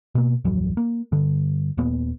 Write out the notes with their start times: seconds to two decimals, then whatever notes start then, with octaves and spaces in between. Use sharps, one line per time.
0.15 B2 A#3
0.44 D1 A1 F2 F#3
0.77 A#3
1.12 G2 D3
1.77 D#1 A#2 A#3 B3